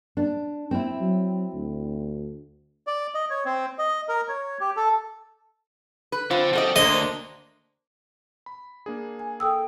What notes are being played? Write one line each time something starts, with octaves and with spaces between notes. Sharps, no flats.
D4
C4 E4
F#3
D2
D5
D#5
C#5
C4
D#5
A#4
C#5
G4
A4
B4
D3 C4 F4
G3 F#4 A4 D5 D#5
D2 A#3 D4 C5 D#5
B5
A#3 D4 G#4
G#5
A4 G5 D#6 E6